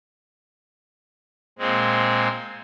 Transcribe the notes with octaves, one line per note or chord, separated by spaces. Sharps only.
A#2 G#3 C4